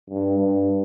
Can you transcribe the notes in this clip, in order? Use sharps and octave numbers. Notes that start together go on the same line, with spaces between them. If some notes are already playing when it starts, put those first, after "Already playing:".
G2
G2